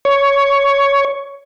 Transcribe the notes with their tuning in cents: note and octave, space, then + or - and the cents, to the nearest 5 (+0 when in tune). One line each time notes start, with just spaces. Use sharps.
C#5 +10